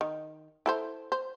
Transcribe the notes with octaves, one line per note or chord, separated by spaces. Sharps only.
D#3
E4 A4 C5
C5